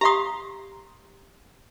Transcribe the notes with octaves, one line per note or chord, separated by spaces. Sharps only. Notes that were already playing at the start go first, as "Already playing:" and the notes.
G4 F5 A#5 C6 D#6